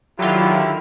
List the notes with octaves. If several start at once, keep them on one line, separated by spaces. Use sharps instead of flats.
D3 D#3 F#3 E4 F4 G4 F6